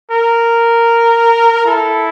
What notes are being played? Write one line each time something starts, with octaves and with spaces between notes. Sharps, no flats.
A#4
E4 A4